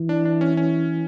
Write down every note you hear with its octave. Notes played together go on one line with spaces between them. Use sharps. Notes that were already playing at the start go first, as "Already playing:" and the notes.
Already playing: E3
D4
D4
C#4
C#4